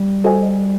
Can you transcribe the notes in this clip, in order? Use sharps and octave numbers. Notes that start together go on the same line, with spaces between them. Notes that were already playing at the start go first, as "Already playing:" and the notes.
Already playing: G3
F#4 A4 C5 D#5 G#5